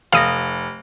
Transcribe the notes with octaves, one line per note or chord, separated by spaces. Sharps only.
F1 F5 D#6 A#6